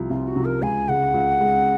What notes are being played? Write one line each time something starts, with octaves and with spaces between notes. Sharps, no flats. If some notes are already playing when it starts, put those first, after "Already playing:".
Already playing: C2 C3 F3
C2 F4
F#4
C3 F3
A#4
C#2 G#5
C#3 G#3 F#5
C#2
C#3 G#3